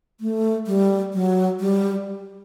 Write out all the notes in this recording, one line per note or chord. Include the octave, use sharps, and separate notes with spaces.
A3
G3
F#3
G3